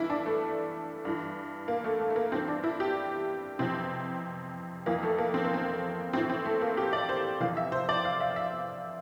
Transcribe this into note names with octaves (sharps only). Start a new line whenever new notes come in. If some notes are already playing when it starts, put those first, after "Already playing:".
Already playing: G2 E3 E4
D4
A3
G2 E3
A#3
A3
A3
A3
A#3
G2 E3 C4
D4
E4
G4
F2 C3 E3 C4
F2 E3 A#3
A3
A#3
C4
A#3
C4
A2 E3 C4
C4
A3
A#3
G4
D5
C5
F2 C3 E3 F5
E5
C5
D5
F5
E5
E5